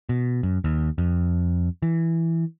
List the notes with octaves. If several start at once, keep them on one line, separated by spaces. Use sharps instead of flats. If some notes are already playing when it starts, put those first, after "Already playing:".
B2
F#2
D#2
F2
E3